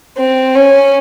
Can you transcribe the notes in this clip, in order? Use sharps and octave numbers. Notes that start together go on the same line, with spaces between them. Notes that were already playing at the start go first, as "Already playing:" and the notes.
C4
C#4